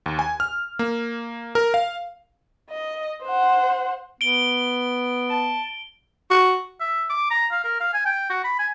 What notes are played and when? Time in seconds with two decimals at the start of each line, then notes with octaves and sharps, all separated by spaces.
0.06 D#2
0.19 G#5
0.40 F6
0.79 A#3
1.55 A#4
1.74 F5
2.70 D#5
3.24 C5 F#5
4.21 B3 D7 G7
5.30 A5
6.30 F#4
6.80 E5
7.09 D6
7.30 A#5
7.51 F5
7.64 A#4
7.80 F5
7.94 G#5
8.05 G5
8.30 F#4
8.44 B5
8.59 G#5